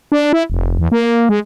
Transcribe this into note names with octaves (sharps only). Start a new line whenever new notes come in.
D4
E4
F1
E2
A#3
G#3